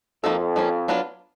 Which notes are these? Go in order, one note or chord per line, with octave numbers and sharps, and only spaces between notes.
F2 F3 A#3 D#4 F#4 A4
F3 A#3 C#4
F#3 B3 D4 F4